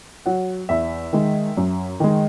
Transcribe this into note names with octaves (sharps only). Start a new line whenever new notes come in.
F#3 F#5
E2 E5
D#3 G#3
F#2
D#3 G#3